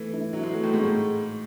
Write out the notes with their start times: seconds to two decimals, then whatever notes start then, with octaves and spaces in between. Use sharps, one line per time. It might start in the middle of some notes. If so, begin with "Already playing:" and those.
Already playing: E3 A3
0.13 E4
0.33 F#3 E4
0.43 G#3
0.53 F#3 A3
0.63 A2
0.74 G#2 G#3
0.83 A2